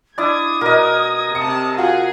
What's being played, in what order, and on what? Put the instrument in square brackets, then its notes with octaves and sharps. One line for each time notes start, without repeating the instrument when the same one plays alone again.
[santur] D4 E4 [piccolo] D#6 [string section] G#6
[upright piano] B2 [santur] A#4 D#5
[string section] C3 A5 [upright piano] C#7
[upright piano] F4 F#4 [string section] G#4